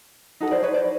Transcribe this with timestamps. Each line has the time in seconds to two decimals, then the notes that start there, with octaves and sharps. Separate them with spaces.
0.40 D#4 F#4 A4
0.51 C5 D5
0.63 B4 C#5
0.74 C5 D5